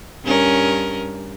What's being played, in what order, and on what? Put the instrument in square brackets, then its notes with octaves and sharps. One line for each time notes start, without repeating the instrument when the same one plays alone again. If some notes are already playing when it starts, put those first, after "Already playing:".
[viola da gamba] G2 C#4 A#4